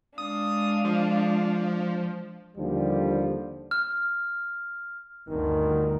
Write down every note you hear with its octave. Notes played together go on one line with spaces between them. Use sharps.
G#3 D4 F5 D#6
F3
D#2 D3 F3 G3
F6
G1 D2 D#3